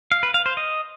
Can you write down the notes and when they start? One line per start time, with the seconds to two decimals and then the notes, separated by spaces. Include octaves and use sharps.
0.12 F5
0.23 B4
0.34 F5
0.46 C5
0.57 D#5